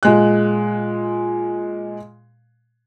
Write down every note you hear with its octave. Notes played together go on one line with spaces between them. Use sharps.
A#2 G#3 F#6